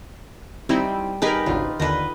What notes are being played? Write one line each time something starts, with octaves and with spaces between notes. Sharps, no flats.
G3 C4 D#4 E4
D#4 G4 G#4 A#4 B4
G#1 D2 C#3 F4
D#2 D3 B4 D#5